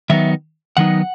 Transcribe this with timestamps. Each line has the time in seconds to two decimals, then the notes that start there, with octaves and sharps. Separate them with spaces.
0.10 D#3 F#3 B3 D#4 E5
0.77 D#3 F#3 B3 D#4 F#5